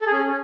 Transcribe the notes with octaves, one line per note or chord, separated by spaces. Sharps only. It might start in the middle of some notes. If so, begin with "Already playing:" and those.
A4
G#4
C#4